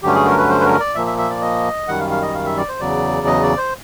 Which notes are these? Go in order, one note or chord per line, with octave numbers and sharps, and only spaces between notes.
G2 D3 F#3 A3 C#4 G4
G#4
A#4
B4
C5
B4
A#4
D5
A#2 F3 A#3 E5
E5
E5
D5
D#5
F#2 D#3 G3 F#5
F5
F5
D#5
F5
E5
D5
C5
E2 C#3 F#3 D5
D#5
D5
C5